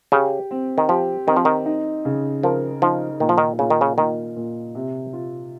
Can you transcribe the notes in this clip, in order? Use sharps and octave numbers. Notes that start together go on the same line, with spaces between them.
C#3 G4
C4
D#3
F3 G4
D#3 C4
F3
D#3
D#4
C#3
F3 A#4
F3 D#4
A#2 D#3
F3
D#3
A#2 C#3
D#3
C#3
A#2 D#3
A#2
C3
F4